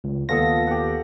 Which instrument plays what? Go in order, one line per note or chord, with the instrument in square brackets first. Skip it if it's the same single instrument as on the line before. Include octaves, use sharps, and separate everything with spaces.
[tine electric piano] C#2
[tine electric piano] D#2 B3 A#6 [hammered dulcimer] F4 A4 D#5
[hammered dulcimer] G4 F#5